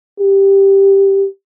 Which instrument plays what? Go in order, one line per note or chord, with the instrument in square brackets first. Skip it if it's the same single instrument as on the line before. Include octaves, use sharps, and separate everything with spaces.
[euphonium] G4